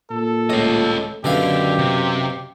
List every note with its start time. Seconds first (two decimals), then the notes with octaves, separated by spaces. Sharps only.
0.11 A#2 A4
0.50 C#2 A2 F4 D#5
1.24 F#2 B2 D3 E4 G4 F5
1.79 C3